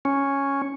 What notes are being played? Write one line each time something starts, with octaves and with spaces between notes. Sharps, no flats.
C#4